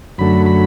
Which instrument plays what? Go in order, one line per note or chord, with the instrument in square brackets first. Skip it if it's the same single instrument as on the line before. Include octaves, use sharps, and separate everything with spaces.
[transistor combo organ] F#2 D3 F#3 A3 B5
B5